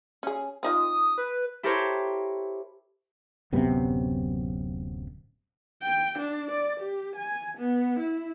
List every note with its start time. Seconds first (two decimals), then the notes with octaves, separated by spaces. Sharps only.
0.23 C#4 G#4
0.63 C4 D#4 F4 D#6
1.18 B4
1.63 E4 G4 A4 A#4 C5 C#5
3.52 D1 F#2 C3 B3
5.83 G5
6.19 D4
6.51 D5
6.80 G4
7.16 G#5
7.58 B3
7.99 E4